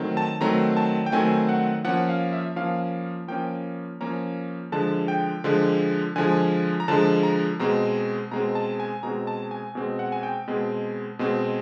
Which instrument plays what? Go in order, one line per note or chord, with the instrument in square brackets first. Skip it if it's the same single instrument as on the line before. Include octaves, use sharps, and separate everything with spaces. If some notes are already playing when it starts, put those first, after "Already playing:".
Already playing: [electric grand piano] D#3 F#3 A3 C4
A5
D#3 F#3 A3 C4 A#5
A5
G5
D#3 F#3 A3 C4 G#5
F#5
F3 A#3 C#4 F#5
F5
E5
F3 A#3 C#4 F5
F3 A#3 C#4 G5
F3 A#3 C#4 A#5
D3 F3 G#3 A5
G5
D3 F3 G#3
D3 F3 G#3 G#5
A#5
D3 F3 G#3 A5
A#5
B2 G#3 C4 A#5
B2 G#3 C4 A#5
A5
G#5
B2 G#3 C4 A#5
A5
G#5
B2 G#3 C4
F#5
G#5
G5
B2 G#3 C4
B2 G#3 C4